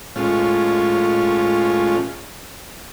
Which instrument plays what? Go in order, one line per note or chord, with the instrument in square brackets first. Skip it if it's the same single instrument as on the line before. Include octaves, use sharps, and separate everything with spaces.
[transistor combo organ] A2 G#3 C#4 F4